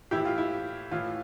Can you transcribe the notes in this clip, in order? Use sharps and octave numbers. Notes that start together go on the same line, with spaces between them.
A2 E3 E4 G4
F4
E4
A2 E3 F4